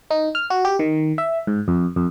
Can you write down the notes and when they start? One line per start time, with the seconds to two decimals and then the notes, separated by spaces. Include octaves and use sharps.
0.11 D#4
0.35 F6
0.50 F#4
0.65 G4
0.79 D#3
1.18 E5
1.47 G#2
1.68 F2
1.96 F2